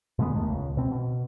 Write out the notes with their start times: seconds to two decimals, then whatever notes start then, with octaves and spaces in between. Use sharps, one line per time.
0.19 A#2 D3 G#3 B3
0.36 G1 D#2 D#3 A3
0.50 C#2
0.77 B2 C4
0.92 B2